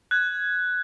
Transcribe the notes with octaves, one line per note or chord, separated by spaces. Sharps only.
F#6 G#6